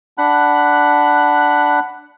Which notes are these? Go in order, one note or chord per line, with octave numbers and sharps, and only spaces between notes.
D4 F#5 B5 F#6